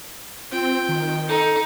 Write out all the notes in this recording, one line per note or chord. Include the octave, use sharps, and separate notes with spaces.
C4 F4 G5
D#3
D#4 A4